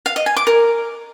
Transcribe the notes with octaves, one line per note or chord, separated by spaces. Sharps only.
F5
D#5
G#5
D6
A#4